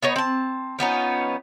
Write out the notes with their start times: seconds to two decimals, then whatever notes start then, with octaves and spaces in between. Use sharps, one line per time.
0.02 B3 D#4 C#5
0.16 C4 A5
0.79 F3 B3 C#4 D#4